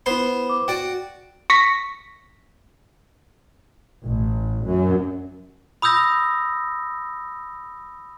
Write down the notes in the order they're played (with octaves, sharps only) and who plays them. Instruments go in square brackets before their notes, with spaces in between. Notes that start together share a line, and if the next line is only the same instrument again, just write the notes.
[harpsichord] B3 C5 C6 [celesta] E4 B5
[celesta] D6
[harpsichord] F#4 D5 [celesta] G5
[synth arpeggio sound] C#6 A#6 B6
[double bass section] A1
F#2
[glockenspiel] B5 D#6 E6 G6 A#6